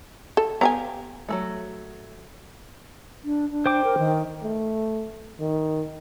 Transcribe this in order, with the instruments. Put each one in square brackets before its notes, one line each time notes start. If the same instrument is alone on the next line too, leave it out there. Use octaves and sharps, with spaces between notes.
[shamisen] A4
[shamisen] B3 D5 G#5 [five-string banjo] G4 F5 A#5
[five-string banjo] F#3 G#3 A3
[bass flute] D4
D4
[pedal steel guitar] C5 G5 D6
[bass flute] A#4
D#3
[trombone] A3
D#3